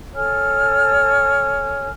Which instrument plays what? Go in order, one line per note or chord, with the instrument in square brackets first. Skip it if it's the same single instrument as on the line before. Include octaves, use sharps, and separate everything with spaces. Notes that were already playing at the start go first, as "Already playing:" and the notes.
[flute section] A4 C#5 G#5 F6